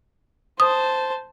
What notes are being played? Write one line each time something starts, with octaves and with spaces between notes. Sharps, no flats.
C5 A5 D#6